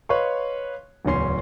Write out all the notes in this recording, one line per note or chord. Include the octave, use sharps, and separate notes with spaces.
B4 C#5 D#5 F5 C6 C#6
D1 E2 C#3 C#4 C6 C7